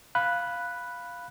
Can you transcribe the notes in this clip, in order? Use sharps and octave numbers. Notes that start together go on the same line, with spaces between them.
F5 B5 F#6